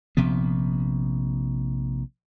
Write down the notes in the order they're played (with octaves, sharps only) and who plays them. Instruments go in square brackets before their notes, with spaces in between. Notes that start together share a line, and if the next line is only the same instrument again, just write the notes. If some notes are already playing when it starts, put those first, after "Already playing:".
[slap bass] A#1 C3 F3 B3